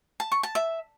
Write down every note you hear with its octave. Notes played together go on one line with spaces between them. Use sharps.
A5
C#6
A5
E5